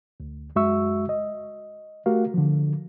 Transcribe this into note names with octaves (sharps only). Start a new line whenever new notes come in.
D2
F#2 G#3 F#4 E5 C#6 E6
D#5
A3 F#4 G4 A#4 F5
D3 F3